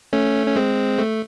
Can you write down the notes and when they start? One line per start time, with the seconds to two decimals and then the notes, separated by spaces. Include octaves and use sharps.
0.13 A3 C#4
0.47 C#4
0.56 G#3 C4
0.99 A3